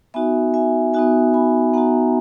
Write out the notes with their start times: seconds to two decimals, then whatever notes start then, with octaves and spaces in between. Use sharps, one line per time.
0.14 B3 D#4 F#4 E5 G#5
0.54 E5 G#5
0.94 B3 D#4 F#4 E5 G#5
1.34 G#5 B5
1.73 B3 D#4 F#4 F#5 A#5